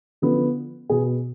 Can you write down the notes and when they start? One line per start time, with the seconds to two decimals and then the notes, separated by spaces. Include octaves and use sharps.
0.22 D3 F3 B3
0.90 B2 B3 G#4